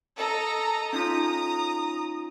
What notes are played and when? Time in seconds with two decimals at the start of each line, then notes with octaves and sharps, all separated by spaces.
0.18 A4 D#5 A#5
0.93 C#4 D#4 F4 A#5 D#6